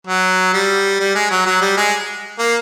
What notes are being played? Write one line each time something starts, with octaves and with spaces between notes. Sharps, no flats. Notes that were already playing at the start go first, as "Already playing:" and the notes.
F#3
G3
G3
G#3
F#3
F#3
G3
G#3
A#3